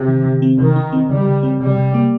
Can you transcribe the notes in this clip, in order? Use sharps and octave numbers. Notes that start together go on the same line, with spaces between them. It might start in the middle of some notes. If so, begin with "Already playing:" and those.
Already playing: C3
D#3
D#3
C4
C3 D#3
D#4
C4
C#3 G3
C#3
C4
C3 G3
C3
A#3